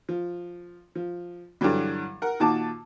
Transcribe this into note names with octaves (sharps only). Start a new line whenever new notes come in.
F3
F3
G2 D3 E3 F#3 G3
A#4 F#5
A#2 D#3 F#4 A5 D6